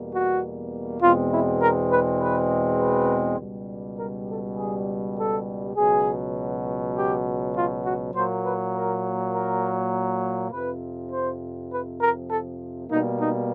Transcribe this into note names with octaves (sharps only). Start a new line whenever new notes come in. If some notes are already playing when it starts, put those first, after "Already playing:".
Already playing: E2 B2 G3 A#3
F#4
E2 B2 G#3 C4 F4
E4
A#4
B4
B4
B4
C#2 B2 G3
A#4
A4
G#4
A4
C#2 B2 F#3 G#4
G4
F4
F#4
A#2 F#3 A#3 C5
B4
A#4
A#4
F2 C3 F3 B4
C5
B4
A#4
A4
B2 G3 A#3 D#4
D#4